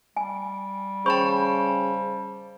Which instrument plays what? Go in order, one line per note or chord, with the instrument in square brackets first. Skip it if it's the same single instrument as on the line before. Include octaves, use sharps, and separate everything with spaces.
[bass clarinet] G3 [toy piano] G#5
[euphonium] C#3 [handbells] C5 A5 [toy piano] G5 B5 C#6